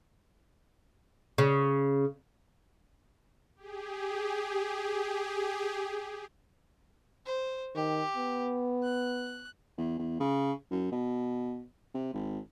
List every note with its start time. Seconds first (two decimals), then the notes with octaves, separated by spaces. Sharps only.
1.38 C#3
3.56 G4 G#4
7.26 C5
7.75 D#3 G4
8.17 B3
8.83 F#6
9.78 E2
9.98 E2
10.20 C#3
10.71 F#2
10.92 B2
11.94 C3
12.14 G#1